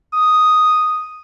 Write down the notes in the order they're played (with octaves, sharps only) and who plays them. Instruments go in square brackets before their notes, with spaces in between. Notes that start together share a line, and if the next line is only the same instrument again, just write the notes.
[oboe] D#6